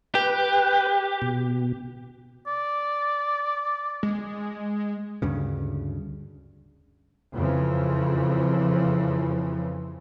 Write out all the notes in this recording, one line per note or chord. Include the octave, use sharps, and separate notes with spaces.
G4 B4
B2
D5
G#3
D2 G2 C#3
F2 C#3 E3 F3